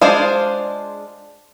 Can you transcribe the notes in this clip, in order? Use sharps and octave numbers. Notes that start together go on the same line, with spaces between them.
G#3 D4 F4 G#4 C5